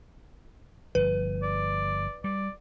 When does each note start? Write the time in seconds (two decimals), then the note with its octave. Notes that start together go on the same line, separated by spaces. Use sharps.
0.95 G1 F3 B4
1.43 D5
2.24 G3 D5